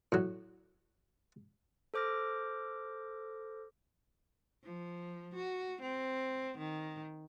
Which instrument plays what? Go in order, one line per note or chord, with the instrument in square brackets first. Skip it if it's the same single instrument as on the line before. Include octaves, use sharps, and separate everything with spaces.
[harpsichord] A2 F#3
[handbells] A4 C5 D6 F6 A#6
[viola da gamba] F3
F#4
C4
D#3